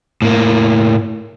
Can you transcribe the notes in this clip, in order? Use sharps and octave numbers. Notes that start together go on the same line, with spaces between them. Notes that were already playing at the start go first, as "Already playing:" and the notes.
A2 A#3